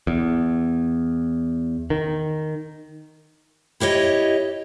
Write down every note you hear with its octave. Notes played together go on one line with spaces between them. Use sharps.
E2
D#3
E4 G4 C#5 D#5